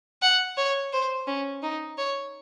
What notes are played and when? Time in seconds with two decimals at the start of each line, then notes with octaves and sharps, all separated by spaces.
0.22 F#5
0.57 C#5
0.93 C5
1.27 C#4
1.62 D#4
1.97 C#5